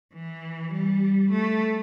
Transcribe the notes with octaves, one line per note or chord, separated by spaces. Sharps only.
E3
G3
A3